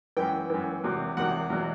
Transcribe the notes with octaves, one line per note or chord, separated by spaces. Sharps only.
F#2 E3 G5
F#2 E3
E2 C3 D#3 F#3
E2 C3 D#3 F#3 F#5
E2 B2 F#3